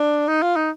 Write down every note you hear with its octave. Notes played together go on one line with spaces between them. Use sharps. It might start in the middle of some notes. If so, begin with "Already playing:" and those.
Already playing: D4
D#4
F4
D#4